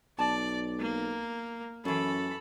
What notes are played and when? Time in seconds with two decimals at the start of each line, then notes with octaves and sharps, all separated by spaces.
0.19 B1 D5 A5
0.80 A#3
1.85 F#2 E3 C#4 A4 B5